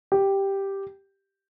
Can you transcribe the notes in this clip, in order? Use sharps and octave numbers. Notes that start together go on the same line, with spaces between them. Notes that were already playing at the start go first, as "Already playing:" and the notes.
G4